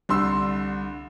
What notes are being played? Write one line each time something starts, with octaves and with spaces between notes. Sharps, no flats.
C2 D3 C6 E6